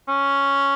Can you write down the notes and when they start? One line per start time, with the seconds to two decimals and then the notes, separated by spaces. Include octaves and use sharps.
0.08 C#4